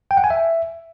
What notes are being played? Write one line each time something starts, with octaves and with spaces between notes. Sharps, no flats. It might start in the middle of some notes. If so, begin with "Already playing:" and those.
G5
F#5
G#5
E5